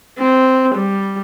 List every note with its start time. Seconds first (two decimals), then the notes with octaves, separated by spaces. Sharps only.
0.18 C4
0.76 G3